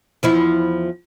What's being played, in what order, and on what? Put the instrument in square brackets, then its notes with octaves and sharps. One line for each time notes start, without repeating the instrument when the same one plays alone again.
[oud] E2 F3 E4